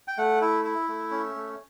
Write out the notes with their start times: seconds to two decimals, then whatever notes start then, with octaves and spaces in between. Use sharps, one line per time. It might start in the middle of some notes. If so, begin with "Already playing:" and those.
0.08 G5
0.18 A3 F#5
0.41 E4 E5
0.65 E4 E5
0.88 A3
1.11 C#4
1.35 A3